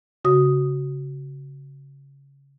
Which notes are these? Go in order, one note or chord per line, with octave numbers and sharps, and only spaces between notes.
C#3 F#4 D#6